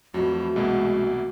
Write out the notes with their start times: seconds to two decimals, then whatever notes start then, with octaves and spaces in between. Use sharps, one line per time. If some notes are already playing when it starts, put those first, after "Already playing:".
0.14 F2 E3 F#3 A3 F#4
0.56 C2 B2 G#3 A#3